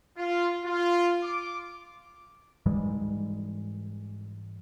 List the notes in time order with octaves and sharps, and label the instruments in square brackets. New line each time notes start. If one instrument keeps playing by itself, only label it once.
[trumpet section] F4
F4
D6
[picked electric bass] G#2 E3 G3 G#3